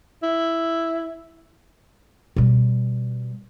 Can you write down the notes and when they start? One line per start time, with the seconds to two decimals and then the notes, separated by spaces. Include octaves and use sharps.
0.23 E4
2.36 B2 G3